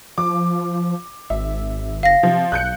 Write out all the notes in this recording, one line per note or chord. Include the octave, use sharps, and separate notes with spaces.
F3 D6
G#1 E5
F#1 F5 A#6
C3 F3
B1 F#6 G6 C#7